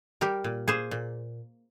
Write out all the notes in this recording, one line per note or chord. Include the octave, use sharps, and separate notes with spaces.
G3 G4 A#4
A#2
A#3 G#4 C5
A#2